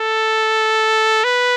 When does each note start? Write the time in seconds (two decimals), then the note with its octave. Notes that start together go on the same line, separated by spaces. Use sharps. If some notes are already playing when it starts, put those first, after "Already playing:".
Already playing: A4
1.24 B4